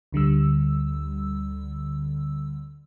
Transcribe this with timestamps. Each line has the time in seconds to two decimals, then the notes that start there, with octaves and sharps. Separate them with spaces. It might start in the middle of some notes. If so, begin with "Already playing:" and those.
0.12 D2 D3 G3 E6